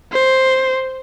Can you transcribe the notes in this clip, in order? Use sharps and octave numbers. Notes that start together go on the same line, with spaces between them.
C5